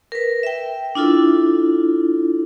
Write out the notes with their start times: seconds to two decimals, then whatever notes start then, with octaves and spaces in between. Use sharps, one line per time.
0.12 A#4 B4
0.43 E5 G5
0.95 D4 E4 F4 A4